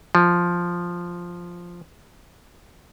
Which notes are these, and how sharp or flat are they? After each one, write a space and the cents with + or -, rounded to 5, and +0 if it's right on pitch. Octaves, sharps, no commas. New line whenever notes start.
F3 +0